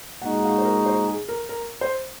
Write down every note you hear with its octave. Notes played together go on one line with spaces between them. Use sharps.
A#2 G#3 D#4 F#4 F#5
F5
C5
A#4
C5
G#4
A#4
A#4
C5